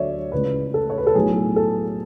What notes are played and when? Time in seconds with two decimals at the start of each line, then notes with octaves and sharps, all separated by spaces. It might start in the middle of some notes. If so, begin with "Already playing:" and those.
Already playing: D2 D3 F#3 A3 C#5 D5 E5
0.32 C#2 C#3 E3 B4
0.74 A4
0.90 C#5
0.98 B4
1.07 A4
1.15 B1 A2 F#3 A3 G#4
1.56 A4